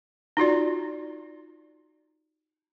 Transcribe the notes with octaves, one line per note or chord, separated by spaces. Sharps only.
D#4 F4 F#4 D5